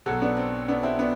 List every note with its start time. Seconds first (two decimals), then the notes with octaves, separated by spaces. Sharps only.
0.06 B1 B2 F#3 F#4 A4
0.21 B3 D4
0.37 C4
0.68 B3 D4
0.83 C4 E4
0.99 B3 D4